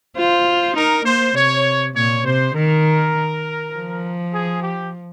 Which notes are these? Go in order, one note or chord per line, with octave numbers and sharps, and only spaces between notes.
F4 C5
D#4 A#4
A#3 C5
C3 C#5
A#2 C#5
C3 C5
D#3 A#4
F3
G#4
G4